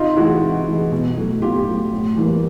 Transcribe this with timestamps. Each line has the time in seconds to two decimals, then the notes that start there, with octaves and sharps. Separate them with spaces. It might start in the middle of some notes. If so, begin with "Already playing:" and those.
Already playing: C3 D#4 F4
0.17 E3 G#3 E4 F#4
0.42 C3
0.67 E3 G#3
0.92 B2
1.17 F#3 A3
1.41 B2 F4 G4
1.66 F#3 A3
1.91 A2
2.16 E3 G3 A#3